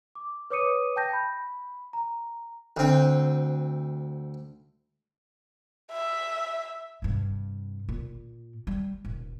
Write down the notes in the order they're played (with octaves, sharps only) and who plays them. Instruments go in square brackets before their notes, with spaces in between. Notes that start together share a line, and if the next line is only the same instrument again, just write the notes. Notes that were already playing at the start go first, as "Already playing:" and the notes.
[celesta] D6
B4 C#5 D6 D#6 C#7 D#7
G5 A5 G6 A#6
B5
A#5
[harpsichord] D2 C4
[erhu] E5
[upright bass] G2 C3
A#2
G3
D#1